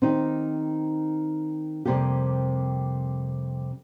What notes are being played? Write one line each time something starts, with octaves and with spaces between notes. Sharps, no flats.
D#3 C4 D#4 G4
F2 C3 G3 A#3 G4